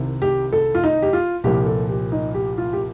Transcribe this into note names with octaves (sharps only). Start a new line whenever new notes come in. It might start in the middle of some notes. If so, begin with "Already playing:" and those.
Already playing: C2 C3 D#3
G4
A4
F4
D#4
G4
F4
C2 A#2 F3 G4
A4
G4
D#4
G4
F4
G4